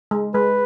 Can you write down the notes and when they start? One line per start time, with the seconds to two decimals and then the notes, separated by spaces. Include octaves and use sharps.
0.11 G#3
0.34 G#3 B4